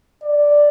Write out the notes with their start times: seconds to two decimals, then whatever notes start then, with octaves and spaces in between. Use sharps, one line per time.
0.23 D5